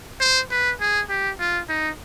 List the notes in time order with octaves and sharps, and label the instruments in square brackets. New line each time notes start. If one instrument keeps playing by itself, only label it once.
[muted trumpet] C5
B4
G#4
G4
F4
D#4